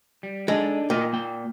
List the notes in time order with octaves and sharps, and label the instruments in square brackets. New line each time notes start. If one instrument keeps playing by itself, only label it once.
[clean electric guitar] G3
[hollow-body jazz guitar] G#3 [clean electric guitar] D4 D#4 A4
[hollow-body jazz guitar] A#2 [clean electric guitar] A#4 D#5 G5
[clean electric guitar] A#3 G5